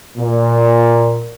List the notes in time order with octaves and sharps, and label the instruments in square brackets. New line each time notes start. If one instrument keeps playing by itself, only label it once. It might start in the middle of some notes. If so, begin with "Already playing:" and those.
[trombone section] A#2